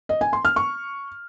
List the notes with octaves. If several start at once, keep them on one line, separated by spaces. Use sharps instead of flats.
D#5
G#5
C6
F6
C#6